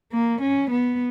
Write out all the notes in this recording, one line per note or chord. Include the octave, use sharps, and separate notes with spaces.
A#3
C#4
B3